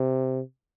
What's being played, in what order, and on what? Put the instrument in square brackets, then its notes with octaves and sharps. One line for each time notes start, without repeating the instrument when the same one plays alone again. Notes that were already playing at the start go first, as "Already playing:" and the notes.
Already playing: [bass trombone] C3